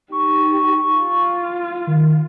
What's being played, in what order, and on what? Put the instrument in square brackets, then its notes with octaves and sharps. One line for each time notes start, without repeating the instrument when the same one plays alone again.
[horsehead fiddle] D#4 G4 [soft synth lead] C#6
[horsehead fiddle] F4
[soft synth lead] D#3